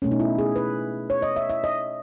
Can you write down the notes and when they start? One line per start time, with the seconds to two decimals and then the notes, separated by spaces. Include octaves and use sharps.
0.02 B2 A3 C#4
0.11 D#4
0.20 E4
0.38 G#4
0.56 B4
1.10 C#5
1.22 D#5
1.36 E5
1.50 E5
1.64 D#5